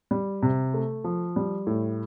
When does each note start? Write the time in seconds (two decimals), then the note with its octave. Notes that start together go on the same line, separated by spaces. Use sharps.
0.11 G3
0.42 C3
0.74 A3
1.04 F3
1.36 G3
1.67 A2